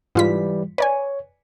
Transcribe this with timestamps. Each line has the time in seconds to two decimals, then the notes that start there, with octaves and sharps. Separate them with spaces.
0.15 G#2 E3 G3 F4 B6
0.78 B4 C#5 D5 G#5